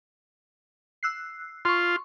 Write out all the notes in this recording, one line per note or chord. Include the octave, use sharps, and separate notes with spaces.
E6 F#6 C7
F4 C6 C#6